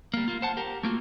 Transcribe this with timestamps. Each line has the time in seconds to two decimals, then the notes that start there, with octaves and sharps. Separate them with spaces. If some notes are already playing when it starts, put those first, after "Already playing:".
0.14 G3 A#3
0.28 A#3 F4
0.42 C5 F#5 A5
0.57 G4 A#4
0.83 A3 A#3 F4 F#4